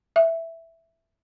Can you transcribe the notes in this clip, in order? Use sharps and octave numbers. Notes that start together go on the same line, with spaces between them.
E5